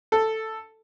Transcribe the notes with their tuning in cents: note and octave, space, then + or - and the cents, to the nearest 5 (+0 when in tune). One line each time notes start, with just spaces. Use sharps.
A4 +5